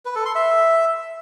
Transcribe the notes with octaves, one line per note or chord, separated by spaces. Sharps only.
B4
A4
C6
E5